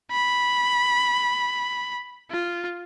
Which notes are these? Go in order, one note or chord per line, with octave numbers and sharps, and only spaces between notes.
B5
F4